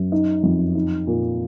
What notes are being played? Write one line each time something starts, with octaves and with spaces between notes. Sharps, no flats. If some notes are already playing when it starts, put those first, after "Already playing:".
Already playing: F#2
D#4
F2
D#4
A#2